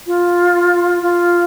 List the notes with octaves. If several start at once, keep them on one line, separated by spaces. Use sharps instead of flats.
F4
F4